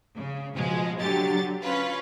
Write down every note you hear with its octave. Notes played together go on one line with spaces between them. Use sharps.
C#3
B2 F3 G#3
D3 F#3 G4 A6
C#4 F4 B4